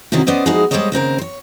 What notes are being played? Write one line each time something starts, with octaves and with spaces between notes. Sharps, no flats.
G#2 C3 D#3 C#4 E4 F#4
B3 C#4 C5 D5 D#5
F3 G#3 D#4 E4 F#4 G#4
G3 G#3 A4 C5 C#5 D#5
D#2 C#3 C4 A#4
C5 C#5